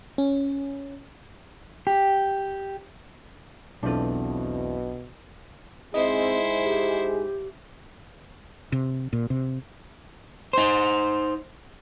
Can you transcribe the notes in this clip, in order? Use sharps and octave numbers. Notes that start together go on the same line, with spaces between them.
C#4
G4
B1 E2 B2 C4 D4 F4 A4
G#2 C4 E4 G#4 C5 D#5
G4
C3
A#2
C3
D#4 C5